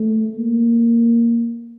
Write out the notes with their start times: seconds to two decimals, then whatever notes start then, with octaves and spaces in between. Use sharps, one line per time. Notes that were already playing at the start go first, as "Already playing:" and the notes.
Already playing: A3
0.37 A#3